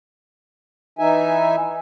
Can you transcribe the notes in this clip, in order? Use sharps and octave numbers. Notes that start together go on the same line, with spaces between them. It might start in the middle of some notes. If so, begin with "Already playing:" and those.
E3 D#4 E5 G#5